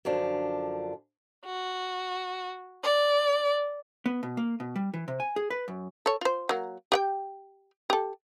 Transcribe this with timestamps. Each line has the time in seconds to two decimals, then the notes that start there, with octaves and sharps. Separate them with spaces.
0.05 F#2 D3 F3 D4
1.45 F#4
2.83 D5
4.06 B3
4.23 B2
4.37 A#3
4.60 B2
4.76 G3
4.94 E3
5.08 C3
5.20 G#5
5.36 G#4
5.50 B4
5.68 F#2
6.06 A4 C#5
6.21 F4 C5
6.49 F#3 A#3
6.92 G4 F#5 G5
7.90 G4 A4